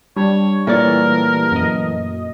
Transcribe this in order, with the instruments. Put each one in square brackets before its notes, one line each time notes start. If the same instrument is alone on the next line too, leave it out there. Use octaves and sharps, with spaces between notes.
[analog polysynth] G3 [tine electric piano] D4 [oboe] C#5
[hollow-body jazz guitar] A#2 C#5 D5 [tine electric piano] E3 A3 [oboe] A#4
[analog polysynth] F#2 D#5